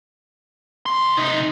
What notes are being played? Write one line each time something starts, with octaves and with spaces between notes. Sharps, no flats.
B1 C6
C3 D#4